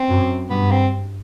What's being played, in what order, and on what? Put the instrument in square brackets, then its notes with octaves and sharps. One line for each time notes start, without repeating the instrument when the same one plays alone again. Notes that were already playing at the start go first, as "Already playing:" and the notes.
Already playing: [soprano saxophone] C4
[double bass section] F#2
[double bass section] G2 [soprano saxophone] B3
[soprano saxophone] C4